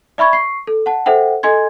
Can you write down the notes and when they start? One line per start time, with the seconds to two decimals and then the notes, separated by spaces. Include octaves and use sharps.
0.18 D5 E5 B5 C#6 G#6
0.33 C#6 C7
0.67 A4
0.86 F#5 A5
1.06 A4 C5 E5 F#5 G5
1.43 A4 D#5 G#5 C6 G#6